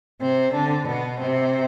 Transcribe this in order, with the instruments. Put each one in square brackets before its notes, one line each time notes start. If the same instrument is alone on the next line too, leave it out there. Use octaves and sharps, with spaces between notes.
[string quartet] C3 C4
D3 D4
B2 B3
C3 C4